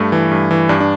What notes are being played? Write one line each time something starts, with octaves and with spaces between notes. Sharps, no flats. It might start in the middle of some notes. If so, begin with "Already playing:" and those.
Already playing: G2 A3
E3
G2
E3
G2 D4
D4